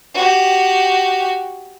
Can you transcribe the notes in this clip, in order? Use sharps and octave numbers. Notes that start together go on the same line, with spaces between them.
F#4 G4